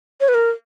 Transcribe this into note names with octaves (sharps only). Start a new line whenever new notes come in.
C#5
B4
A#4